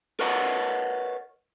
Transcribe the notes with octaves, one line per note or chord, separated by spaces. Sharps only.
A#4 B4 C#5 D#5 F#5